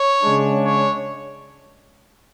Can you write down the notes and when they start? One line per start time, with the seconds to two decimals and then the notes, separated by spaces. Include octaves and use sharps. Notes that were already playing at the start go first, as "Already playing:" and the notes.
Already playing: C#5
0.24 C#3 G#3 D4
0.64 C#5